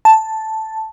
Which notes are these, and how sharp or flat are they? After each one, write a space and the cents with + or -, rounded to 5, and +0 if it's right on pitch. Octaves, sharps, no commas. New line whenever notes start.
A5 +0